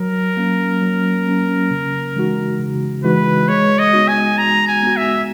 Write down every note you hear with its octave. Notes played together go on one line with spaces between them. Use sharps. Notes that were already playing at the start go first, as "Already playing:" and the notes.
Already playing: F#3 A#4
A#3 C#4
F#3
A#3 C#4
C#3
E3 G#3 D#4 F#4
C#3
E3 G#3 D#4 F#4 B4
G#3 C#5
D#5
B3 D#4 F#4
G#5
G#3 A#5
G#5
B3 D#4 F#4
E5